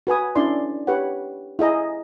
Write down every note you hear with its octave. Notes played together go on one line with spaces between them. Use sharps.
F#4 B4 G#5 D#6
C#4 D4 E4 D5 C6
G4 B4 C#5 F#5
E4 G#4 D#5 A#5